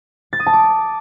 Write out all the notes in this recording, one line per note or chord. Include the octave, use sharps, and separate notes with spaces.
A6
D#6
A5
D6